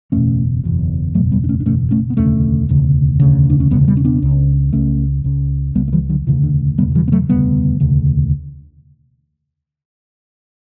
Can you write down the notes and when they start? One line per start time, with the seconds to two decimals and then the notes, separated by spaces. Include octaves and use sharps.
0.12 F#1 E2 B2 A3 C#4
0.64 F#1 E2 B2
1.14 F#1 E2 B2 F#3 A3
1.32 G3 B3
1.44 D4
1.49 A3 C#4
1.60 D4
1.66 F#1 E2 B2 A3 C#4
1.91 A3 C#4
2.10 B3
2.17 E1 D2 C#3 A3 C#4
2.69 E1 D2 C#3
3.20 E1 D2 C#3
3.50 D4
3.60 C#4
3.71 E1 D2 C#3 G3 B3
3.88 G3 B3
3.97 C#4
4.05 B3 D4
4.22 C#2 C#3
4.73 C#2 C#3 A3 C#4
5.24 C#2 C#3
5.75 C#2 C#3 G3 B3
5.88 A3
5.92 E3 G3
6.09 D3 F#3
6.27 E1 D2 C#3 E3
6.43 D3
6.78 E1 D2 C#3 G3 B3
6.95 E3 G3
7.08 B3
7.12 F#3 A3
7.29 E1 D2 C#3 G3 B3
7.80 E1 D2 C#3